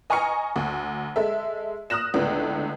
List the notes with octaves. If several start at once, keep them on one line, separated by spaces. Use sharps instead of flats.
D#5 G#5 A#5 C#6 F6 C#7
D2
G#3 A4 E5
D#6 F6 F#6 A#6 E7
C#2 A2 D3 B3